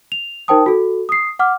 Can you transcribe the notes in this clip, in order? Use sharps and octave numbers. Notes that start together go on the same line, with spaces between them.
F7
D#4 A#4 C5 G5 A5 D#6
F#4 A4
D#6 C7
F#5 D6 F6